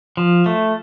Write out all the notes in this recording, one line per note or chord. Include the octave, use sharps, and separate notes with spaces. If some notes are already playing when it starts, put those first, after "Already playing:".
F3
A3